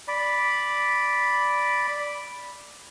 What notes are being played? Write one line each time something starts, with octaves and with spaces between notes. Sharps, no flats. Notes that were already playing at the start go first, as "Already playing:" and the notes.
D5 B5